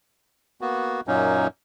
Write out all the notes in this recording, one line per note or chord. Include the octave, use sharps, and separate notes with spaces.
A#3 B3 F#4
F#2 A#2 F#3 A#3 C#4 D#4